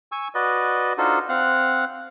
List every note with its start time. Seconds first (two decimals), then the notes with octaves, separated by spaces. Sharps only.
0.12 G#5 C#6 E6
0.35 F#4 B4 D5 D#5
0.98 D4 D#4 F4 F#4 A4 C5
1.29 C4 F5 F#5 F#6